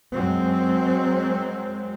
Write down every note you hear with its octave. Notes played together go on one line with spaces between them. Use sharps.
F#2 F#3 G#3 C4